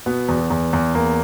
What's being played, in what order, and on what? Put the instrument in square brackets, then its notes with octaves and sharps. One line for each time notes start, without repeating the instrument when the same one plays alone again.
[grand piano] B2 B3
E2
E2
E2
E2 A#3